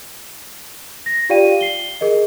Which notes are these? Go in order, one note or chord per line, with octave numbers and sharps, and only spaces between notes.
A#6
F4 G4 D5 F5 G5 D#7
C7 G7
G#4 A#4 D#5